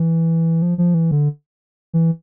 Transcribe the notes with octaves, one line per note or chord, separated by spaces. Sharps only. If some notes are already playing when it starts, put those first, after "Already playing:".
Already playing: E3
F3
F3
E3
D3
E3